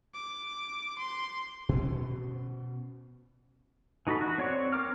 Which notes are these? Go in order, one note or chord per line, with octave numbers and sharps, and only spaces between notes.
D6
C6
B2 C#4
E3 D#4 F#4 A4 B5
F#4
C4 C#5 D5 C#6
C4 A#4 D6 F6